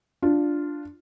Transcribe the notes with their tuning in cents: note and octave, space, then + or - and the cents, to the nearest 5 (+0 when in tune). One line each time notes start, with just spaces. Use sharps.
D4 +0 F4 +0